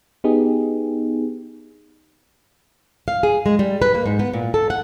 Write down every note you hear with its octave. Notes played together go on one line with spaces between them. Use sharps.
B3 D#4 G4 G#4
F5
G#4
G#3
G3
B4
A#3
G#2
B3
A#2
A4
F#5